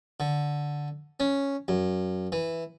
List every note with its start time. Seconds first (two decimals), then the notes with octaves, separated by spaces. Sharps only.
0.20 D3
1.20 C#4
1.68 F#2
2.32 E3